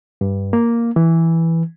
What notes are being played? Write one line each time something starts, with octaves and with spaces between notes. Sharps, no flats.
G2
A#3
E3